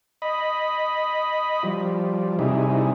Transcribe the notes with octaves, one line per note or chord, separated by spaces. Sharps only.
D#5 B5
F3 G3
C3 G3 D#4 E4 G#4